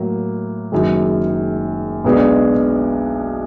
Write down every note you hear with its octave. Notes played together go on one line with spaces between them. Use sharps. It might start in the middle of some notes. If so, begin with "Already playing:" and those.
Already playing: A2 F#3 A#3
F#1 F#2 D#3 G#3
B1 B2 G#3 B3 D4